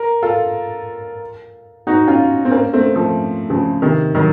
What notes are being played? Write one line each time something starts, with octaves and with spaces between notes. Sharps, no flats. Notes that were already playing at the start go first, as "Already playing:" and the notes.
Already playing: A#4
F4 A4
D#4 F#4
C#4 F4
C4
A#3 C#4
A3 C4
F3 A3
C#3 F3
C3 D#3
D#3 F#3